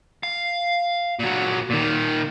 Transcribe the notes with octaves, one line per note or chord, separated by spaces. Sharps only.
F5
A#2 F#3
A#2 D#3